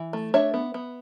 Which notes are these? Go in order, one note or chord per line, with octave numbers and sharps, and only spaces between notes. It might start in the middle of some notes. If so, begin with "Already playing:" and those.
Already playing: E3
A3
D4 C#5 E5
B3
B3